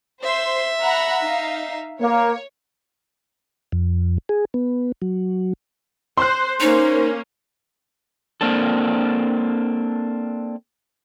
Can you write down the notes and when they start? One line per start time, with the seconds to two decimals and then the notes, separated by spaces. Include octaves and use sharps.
0.23 C5 E5 C6
0.83 F#5 A#5 B5
1.23 D#4 F5
2.02 A#3 C#5
3.72 F2
4.29 G#4
4.54 B3
5.02 F#3
6.18 C5 C6 F#6
6.60 A#3 C#4 D#4 C5
8.41 A#3 C4 D4 A4